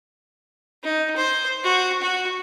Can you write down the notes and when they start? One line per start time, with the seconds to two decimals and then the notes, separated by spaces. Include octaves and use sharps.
0.84 D#4
1.17 C5
1.64 F#4
2.02 F#4